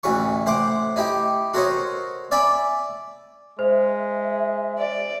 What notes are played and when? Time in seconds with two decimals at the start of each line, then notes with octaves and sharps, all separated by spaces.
0.03 A1 D2 E3 A3 C#6
0.46 A2 C5 F#5 D6
0.96 D#4 E4 G4 G5
1.54 F#4 A4 A#4 C5 C#5 D#5
2.31 D5 E5 G#5 A5 B5 D6
3.59 G#3 C5 E5
4.78 D5